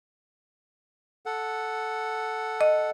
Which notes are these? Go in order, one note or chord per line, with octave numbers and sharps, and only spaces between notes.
A4 F#5
D#5